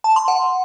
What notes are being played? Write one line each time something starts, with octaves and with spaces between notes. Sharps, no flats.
A5
C6
F#5